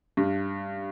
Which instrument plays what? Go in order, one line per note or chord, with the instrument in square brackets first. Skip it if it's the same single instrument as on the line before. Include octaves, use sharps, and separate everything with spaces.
[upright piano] G2